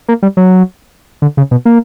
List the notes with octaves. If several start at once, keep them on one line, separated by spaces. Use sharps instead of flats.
A#3
G3
F#3
D3
C#3
B2
A#3